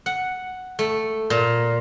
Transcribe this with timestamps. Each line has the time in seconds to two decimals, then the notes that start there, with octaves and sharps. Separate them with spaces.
0.06 F#5
0.79 A3
1.30 A#2